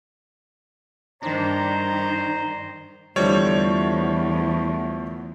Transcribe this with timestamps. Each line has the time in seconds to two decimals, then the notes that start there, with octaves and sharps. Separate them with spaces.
1.23 G2 D#3 D4 C5 A#5
3.16 E2 D3 F3 G3 A3 C#5